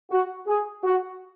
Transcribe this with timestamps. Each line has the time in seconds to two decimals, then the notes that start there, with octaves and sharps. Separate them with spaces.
0.10 F#4
0.46 G#4
0.84 F#4